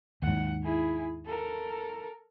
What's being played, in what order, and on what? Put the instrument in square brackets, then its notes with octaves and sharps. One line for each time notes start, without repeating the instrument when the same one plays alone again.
[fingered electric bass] D#2 G#2 [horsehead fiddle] F#5
[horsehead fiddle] E4 G#4
A4 A#4